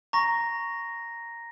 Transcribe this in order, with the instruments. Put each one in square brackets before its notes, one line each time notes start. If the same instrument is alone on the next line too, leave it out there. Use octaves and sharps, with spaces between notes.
[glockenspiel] A#5 A#6 [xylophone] C#6